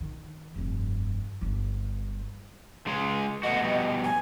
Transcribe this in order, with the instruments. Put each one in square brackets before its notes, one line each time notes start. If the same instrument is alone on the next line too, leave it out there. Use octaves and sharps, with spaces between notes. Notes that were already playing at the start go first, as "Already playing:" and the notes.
[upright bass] D#3
F1 G2
G1 G2
[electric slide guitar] C#3 G#3
[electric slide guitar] B2 A3 F#4 [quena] D#5
[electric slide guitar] B2 G3
[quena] G#5